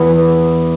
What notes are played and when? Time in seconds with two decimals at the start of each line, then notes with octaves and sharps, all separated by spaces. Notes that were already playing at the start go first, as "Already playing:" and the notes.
Already playing: E2 E3 B3